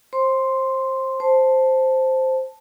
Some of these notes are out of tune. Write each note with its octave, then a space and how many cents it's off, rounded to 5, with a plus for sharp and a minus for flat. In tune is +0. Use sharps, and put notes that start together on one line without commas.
C5 +20 C6 +0
C5 +0 A5 +0